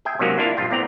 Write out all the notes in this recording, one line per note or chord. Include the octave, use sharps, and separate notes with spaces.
G#4 E5 G5 G#5
C3 D#3 F#3 G#3 A#3 C#4
A#3 D4 E4 F4 F5
A#1 G2 F4 G5
A2 B3 C4 D5 A#5